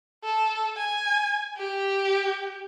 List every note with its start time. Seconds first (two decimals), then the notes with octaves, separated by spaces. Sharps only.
0.24 A4
0.77 G#5
1.58 G4